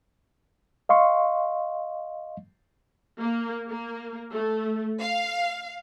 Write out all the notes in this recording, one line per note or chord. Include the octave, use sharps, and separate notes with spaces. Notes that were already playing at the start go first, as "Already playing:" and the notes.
D#5 F5 C6 C#6
A#3
A#3
A3
F5